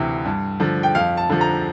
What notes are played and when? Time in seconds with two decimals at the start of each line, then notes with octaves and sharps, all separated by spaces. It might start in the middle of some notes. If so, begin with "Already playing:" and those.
Already playing: D2 C3 E3
0.26 G2
0.60 D3 F3
0.83 G5
0.95 F2 F5
1.17 A5
1.30 D3 F3
1.41 A#5